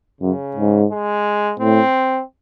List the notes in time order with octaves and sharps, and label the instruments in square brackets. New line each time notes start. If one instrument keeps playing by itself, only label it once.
[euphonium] F#2 [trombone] C#3
[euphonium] G#2
[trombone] G#3
[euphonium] A2 [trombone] C4